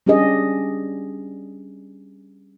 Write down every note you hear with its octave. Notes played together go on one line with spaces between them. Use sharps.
G3 C#4 D4 G4 G#4 D#5